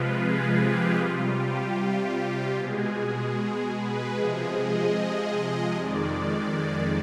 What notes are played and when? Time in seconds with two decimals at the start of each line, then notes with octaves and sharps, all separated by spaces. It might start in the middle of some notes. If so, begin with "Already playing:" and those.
Already playing: C3 F3 G#3 F4 B4
0.16 G#4
0.56 G4
0.96 C3 G3 F4
1.36 G4
2.56 B2 G#3 G#4
3.76 B4
4.15 C3 F3 G#3 G#4
4.56 D#5
5.76 F2 D#3 G#3 D5